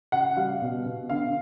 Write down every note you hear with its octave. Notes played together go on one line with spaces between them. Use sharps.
C#3 F#5
G3 F5
B2
B2
D3 F5